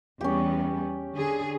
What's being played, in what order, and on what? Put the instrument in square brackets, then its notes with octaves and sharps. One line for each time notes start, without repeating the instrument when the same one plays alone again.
[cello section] E2 G3 B3 [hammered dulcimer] C#4 G4
[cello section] D3 G#4